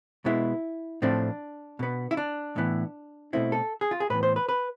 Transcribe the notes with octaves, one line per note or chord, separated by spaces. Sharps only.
B2 G#3 B3 E4
A2 F3 A3 C4 D4
B2 B3
E4
D4
A2 E3 B3
B2 A3 C4 E4
A4
G#4
F4
G#4
A2 E3 B3 B4
C5
B4
B4